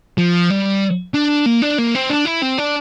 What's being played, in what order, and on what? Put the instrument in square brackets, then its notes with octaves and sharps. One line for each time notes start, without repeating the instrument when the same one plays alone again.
[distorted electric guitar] F3
G3
D4
A#3
D4
A#3
C4
D4
E4
C4
D4